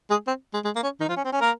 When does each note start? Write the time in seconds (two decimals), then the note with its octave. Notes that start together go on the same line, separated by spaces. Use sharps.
0.10 G#3 G#4
0.28 C4
0.54 G#3
0.65 G#3
0.76 A#3
0.83 C#4
1.00 D#3 D#4
1.08 F3 F4
1.16 C#4
1.25 C4
1.33 C#4
1.41 A#3 A#4